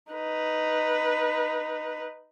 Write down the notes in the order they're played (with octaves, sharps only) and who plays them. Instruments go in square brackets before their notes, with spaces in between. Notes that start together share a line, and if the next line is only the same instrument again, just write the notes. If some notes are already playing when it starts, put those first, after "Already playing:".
[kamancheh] D#4 B4